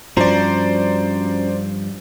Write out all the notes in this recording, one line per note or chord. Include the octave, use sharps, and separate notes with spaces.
G2 F3 C#4 F#4 C5 D5 A#5